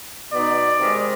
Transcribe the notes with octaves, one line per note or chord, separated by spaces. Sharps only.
B2 B3 D#4 D5
C3 D#3 G#3